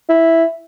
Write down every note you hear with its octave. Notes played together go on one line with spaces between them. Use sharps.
E4